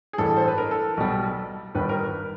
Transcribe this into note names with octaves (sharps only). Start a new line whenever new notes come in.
G#4
A1 G2 E3 G3 A4
C5
B4
A#4
A4
A4
B1 B2 G3
G1 G2 D#3 G3 B4
A#4
B4